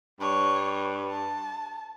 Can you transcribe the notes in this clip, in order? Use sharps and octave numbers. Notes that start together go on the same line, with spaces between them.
G2 C#5
A5